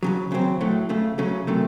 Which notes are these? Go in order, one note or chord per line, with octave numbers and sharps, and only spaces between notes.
C#2 C#3 F#3
D#2 C#3 F#3 C4
A2 F#3 A3
C#2 C#3 A3
C#3 F#3 A3 C#4
C3 D#3 F#3 A3